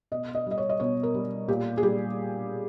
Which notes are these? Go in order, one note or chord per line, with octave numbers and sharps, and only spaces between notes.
B2 D#5
D#5
G3 D#5
C#5
D#5
B2 C#5
A#4
G3
A#2 G4
G#4
G3 G4